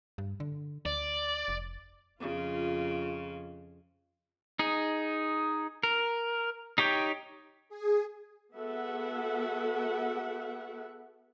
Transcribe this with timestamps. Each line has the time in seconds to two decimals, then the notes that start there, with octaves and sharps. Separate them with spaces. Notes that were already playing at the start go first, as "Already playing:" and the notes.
0.18 G2
0.40 D3
0.85 D2 D5
1.48 F1
2.20 F2 C#3 F4
4.59 D#4 G#4
5.83 A#4
6.78 D#4 G4 C#5 G5
7.69 G#4
8.54 B3 F#4 G#4 A4 E5 F#5